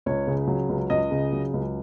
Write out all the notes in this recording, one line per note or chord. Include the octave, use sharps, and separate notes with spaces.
C#2 C#5
C#3
F#3
C#2
C#2 D#5
C#3
F#3
C#2